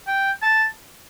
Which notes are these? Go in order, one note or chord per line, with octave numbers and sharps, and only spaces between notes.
G5
A5